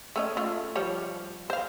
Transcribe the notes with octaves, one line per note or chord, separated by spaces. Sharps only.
A3 C#4 D#5
A3 F4
F3 G3 C#5
C5 F5